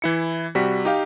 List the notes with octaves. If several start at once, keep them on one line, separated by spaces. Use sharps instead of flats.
E3 E4 C#7
C3 G3 F#4 B6
D#4 G4 F5